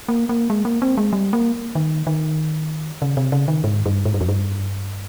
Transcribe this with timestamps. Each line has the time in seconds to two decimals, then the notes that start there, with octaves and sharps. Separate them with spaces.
0.09 A#3
0.29 A#3
0.50 G#3
0.65 A#3
0.82 C4
0.97 G#3
1.13 G3
1.33 A#3
1.75 D#3
2.07 D#3
3.02 C#3
3.17 C3
3.32 C#3
3.48 D#3
3.64 G#2
3.86 G2
4.05 G#2
4.14 G2
4.21 F2
4.28 G2